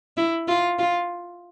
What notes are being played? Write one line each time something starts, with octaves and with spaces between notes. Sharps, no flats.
E4
F4
F4